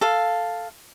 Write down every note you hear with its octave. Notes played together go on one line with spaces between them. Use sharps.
A4 F5